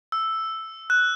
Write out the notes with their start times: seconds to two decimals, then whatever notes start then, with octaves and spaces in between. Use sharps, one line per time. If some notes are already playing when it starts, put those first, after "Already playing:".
0.12 E6
0.90 F#6